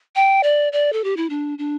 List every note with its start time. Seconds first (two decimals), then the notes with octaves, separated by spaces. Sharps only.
0.16 G5
0.43 D5
0.73 D5
0.93 A4
1.04 G4
1.17 E4
1.30 D4
1.58 D4